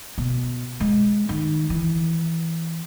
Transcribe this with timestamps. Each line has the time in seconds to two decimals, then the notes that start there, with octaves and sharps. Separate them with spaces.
0.18 B2
0.80 G#3
1.29 D#3
1.70 E3